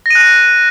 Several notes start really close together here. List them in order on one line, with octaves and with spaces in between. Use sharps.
A#6 D#7 F#6